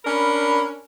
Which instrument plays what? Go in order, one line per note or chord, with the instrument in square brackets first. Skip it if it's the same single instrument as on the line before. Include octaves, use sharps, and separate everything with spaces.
[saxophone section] C#4 D4 A#4 [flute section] B5